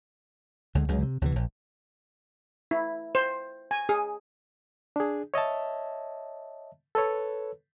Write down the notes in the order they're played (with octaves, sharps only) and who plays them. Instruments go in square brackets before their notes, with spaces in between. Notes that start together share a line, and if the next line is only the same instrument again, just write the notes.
[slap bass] D2 D3 G#3
C#2 C#3 F#3 G#3
C3
D2 C3 D#3 E3
A#1
[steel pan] E4
C5
G#5
G#4
[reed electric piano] D4 G#4
C#5 D#5 E5 A5
A4 B4 C#5